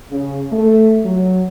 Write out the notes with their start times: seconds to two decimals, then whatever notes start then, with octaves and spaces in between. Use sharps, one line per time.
0.11 C#3
0.52 A3
1.05 F#3